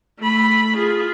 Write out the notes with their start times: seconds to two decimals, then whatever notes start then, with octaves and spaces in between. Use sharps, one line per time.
0.19 A3 B5
0.77 F4 G#4